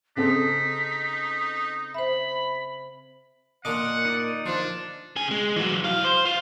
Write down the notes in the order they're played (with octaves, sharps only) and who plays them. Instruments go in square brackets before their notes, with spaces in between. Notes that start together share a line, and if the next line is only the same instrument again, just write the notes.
[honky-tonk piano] C#3 C4 A4 [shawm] D#4 [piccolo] B6
[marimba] C5 E5 [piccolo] B5
[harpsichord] A#2 D4 D6 [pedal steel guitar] D#5 F5 [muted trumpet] F#5
[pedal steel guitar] D#4 D5
[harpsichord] F3 [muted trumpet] D4
[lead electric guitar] C#3 G#5
G#3
E3 F#3
F#3 F5
C5
F4